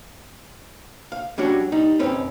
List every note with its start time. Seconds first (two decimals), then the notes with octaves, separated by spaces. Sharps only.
1.12 F5
1.38 G3 C#4 D4 F#4
1.72 G3 D#4
1.99 B1 F#2 C4 C#4 B4